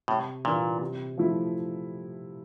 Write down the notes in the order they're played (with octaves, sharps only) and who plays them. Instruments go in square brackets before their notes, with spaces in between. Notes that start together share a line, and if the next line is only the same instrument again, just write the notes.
[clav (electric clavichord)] A2 [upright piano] C3
[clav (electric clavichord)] A#2 [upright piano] E3 A#3 D4 F4
[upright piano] C3
F3 A3 E4